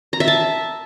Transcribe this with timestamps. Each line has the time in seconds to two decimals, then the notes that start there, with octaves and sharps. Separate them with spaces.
0.13 A#5
0.20 E5
0.28 A5